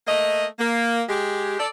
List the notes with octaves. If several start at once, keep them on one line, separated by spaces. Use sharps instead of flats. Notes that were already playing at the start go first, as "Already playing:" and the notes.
A3 A#3 D#5
A#3
G#3 G4
A4 D5